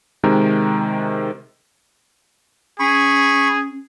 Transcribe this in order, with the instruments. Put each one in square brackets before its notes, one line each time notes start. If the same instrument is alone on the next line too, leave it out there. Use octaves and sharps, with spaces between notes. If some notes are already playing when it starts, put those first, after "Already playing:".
[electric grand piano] C3 D#3 G#3 A#4
[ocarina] C#4 [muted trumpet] G#4 [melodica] B5 C#6